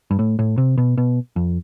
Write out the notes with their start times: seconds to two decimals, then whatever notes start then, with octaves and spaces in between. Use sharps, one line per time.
0.11 G2
0.19 A2
0.39 A2
0.58 C3
0.78 B2
0.98 B2
1.36 F2